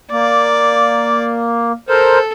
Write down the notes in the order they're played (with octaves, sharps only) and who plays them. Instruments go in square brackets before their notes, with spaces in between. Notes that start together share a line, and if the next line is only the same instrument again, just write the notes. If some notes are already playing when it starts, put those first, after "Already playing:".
[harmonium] A#3 [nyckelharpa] D5
[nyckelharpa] A4 [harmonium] A#4 C5